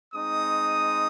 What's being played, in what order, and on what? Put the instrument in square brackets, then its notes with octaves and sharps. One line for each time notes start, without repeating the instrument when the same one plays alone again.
[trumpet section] G#3 C4 D#4 D#6